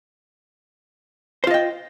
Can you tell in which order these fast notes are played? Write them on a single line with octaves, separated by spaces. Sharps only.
C5 F4 D#5 G5